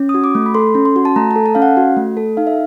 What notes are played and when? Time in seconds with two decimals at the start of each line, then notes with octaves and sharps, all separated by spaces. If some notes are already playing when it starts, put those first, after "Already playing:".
Already playing: C#4
0.09 D#6
0.14 F#4
0.24 D6
0.35 A3
0.46 B5
0.55 A4 C6
0.75 C#4
0.85 C6
0.96 F#4
1.05 A5
1.16 A3 A#5
1.31 A5
1.36 A4
1.46 A5
1.55 C#4 F5
1.62 F#5
1.77 F#4
1.97 A3
2.17 A4
2.37 D#4 F5
2.47 E5